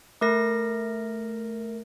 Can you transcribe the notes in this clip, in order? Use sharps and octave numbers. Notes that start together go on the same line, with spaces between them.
A3 A#4 A#6